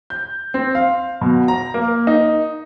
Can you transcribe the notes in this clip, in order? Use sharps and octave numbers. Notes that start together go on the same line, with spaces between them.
G6
C4
F5
B2
A#5
A#3
D#4